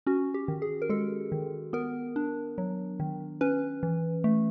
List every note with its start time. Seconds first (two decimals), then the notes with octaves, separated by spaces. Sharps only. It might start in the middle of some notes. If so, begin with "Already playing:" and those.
0.07 C#4 F#4
0.34 G4
0.48 D#3
0.62 G#4
0.82 A#4
0.89 G#3 A4
1.32 D#3
1.73 B3 A#4
2.16 D4
2.58 F#3
3.00 D#3
3.41 C#4 B4
3.83 E3
4.24 A3